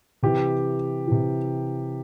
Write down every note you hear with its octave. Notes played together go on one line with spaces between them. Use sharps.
C3 E3 G4
C3 E3